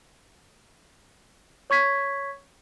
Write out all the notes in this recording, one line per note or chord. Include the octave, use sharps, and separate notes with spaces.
C#5 C#6 G#6 B6